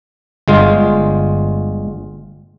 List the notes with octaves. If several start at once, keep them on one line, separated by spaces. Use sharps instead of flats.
G1 G#3 F4